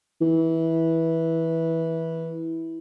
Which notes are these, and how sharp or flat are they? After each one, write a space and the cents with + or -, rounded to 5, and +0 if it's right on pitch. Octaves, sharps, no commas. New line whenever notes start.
E3 -15